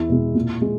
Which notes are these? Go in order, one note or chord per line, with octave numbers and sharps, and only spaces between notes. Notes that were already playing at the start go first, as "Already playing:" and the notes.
Already playing: E2 E4
B2 G#3
A#2
G#3